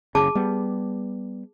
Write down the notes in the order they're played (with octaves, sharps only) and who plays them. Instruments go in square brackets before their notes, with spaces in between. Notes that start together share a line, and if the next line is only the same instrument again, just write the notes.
[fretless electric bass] F#1 C#3 [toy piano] G#4 A5 D6
[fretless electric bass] G3 B3